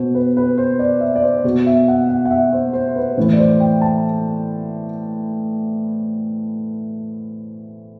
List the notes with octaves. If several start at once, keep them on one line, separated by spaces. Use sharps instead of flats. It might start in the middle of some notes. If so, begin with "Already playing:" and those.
Already playing: B2 C5
B4
B4
C5
D5
E5
D5
C5
B2
E5
F#5
F#5
F#5
E5
C5
C5
B4
A2 E3 B4
D5
C5
G5
A5